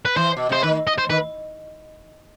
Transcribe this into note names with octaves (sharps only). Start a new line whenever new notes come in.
B4
E3 C5
B2
C3 C5
D#3 B4
D#5
C5
D#3 B4